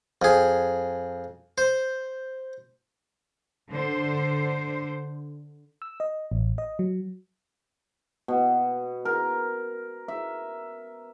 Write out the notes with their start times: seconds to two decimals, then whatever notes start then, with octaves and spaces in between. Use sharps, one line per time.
0.22 F2 G#4
1.58 C5
3.69 D3 C5
5.82 E6
6.00 D#5
6.32 A1
6.58 D#5
6.79 F#3
8.28 B2
9.05 A#4
10.08 E5